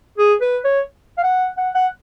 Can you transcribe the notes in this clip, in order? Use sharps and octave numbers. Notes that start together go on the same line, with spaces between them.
G#4
B4
C#5
F5
F#5
F#5
F#5